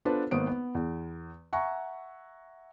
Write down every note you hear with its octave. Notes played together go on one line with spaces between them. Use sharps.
B3 D4 F4 A4 B4 C5
G#1 A#3 B3 C5 D#6 D7
B3
E2
E5 F#5 G#5 A#5 C#6